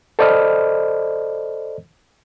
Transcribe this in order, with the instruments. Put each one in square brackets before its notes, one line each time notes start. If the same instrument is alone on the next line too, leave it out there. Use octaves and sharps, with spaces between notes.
[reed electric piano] A4 C5 D5 D#5 B5 F6